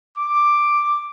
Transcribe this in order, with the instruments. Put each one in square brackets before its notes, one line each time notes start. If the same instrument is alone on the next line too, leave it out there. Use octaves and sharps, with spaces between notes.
[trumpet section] D6